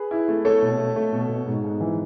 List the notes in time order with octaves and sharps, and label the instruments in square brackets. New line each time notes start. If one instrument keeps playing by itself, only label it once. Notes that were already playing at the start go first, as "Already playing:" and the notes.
Already playing: [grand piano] G#4 B4
E4
A3
A3 A4 C#5
B2
A3
A3
B2
B2
G#2
G#2
E3